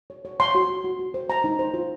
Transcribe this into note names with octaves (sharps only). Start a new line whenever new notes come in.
C#5
C#5
C#5 C6
F#4
F#4
F#4
F#4
C5
C5 A#5
D#4
C5
F4